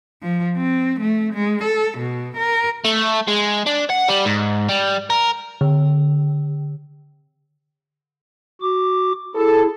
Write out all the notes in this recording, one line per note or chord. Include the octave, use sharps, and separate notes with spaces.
F3
C4
A3
G#3
A4
B2
A#4
A3
G#3
D4
F#5
G3
G#2
G3
A#4
D3
F#4 D6
E4 G#4 A4